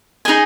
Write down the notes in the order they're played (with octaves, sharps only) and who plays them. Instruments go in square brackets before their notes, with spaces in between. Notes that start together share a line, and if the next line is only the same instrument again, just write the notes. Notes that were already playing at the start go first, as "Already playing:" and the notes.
[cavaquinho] D#4 G#4 D#5 G#5